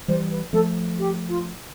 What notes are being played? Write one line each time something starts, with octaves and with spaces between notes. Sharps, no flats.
E3 G3 C5
B4
F3 A3 A4
G4
F4